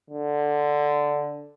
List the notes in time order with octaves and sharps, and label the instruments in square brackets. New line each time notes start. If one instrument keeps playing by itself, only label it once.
[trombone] D3